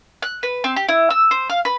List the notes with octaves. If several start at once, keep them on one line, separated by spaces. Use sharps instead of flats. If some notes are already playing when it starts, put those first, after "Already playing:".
F#6
B4
C4
G4
E4
E6
C5
F5
B4